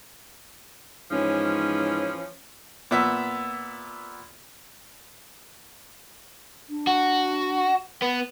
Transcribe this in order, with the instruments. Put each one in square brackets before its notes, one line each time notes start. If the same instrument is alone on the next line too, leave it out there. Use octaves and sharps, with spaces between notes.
[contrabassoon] G#2 [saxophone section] E3 F3 C#4
[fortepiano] A#2 B3 E5
[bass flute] D4
[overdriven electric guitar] F#4
[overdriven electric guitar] B3 [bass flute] B4